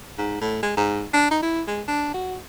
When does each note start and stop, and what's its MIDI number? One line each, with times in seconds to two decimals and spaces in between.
0.18 0.41 44
0.41 0.59 45
0.63 0.73 56
0.77 1.04 44
1.13 1.29 62
1.31 1.41 63
1.42 1.62 64
1.67 1.82 56
1.88 2.12 62
2.14 2.36 66